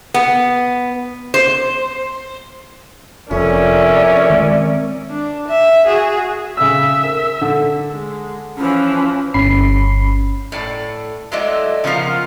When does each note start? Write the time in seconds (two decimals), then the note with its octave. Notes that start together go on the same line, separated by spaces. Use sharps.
0.14 B3
1.34 C5
3.31 F1 F2 C#4 A#4 D5 E5
4.30 D#3 G#3 C4
5.10 D4
5.48 E5
5.85 F#4 G#4
6.57 C#3 E5 E6
7.03 A#4
7.41 D3
7.92 G#3
8.57 E3 F3 C#4
9.34 G1 C#4 B5 C7
10.52 A2 D5 A5
11.32 F#3 G#3 A3 E4 D5 D#5
11.84 C#3 F3 B3 C#4 F4 A#4